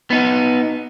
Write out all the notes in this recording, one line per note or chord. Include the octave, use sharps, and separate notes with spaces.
B3 D#4